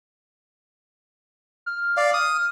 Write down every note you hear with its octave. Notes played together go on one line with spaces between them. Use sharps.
F6
D5 F5
D#6